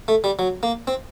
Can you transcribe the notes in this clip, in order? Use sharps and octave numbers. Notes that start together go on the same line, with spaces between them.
A3
G3
F#3
A#3
C4